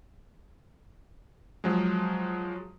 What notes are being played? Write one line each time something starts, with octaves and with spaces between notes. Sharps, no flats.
F3 F#3 G#3